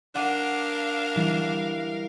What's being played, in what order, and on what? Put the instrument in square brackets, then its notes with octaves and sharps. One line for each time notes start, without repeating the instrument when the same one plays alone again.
[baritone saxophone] D4 [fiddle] A#4 F5 [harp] F#5 D6 D#7
[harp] E3 G3